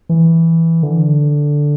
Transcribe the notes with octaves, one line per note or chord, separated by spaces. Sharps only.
E3
D3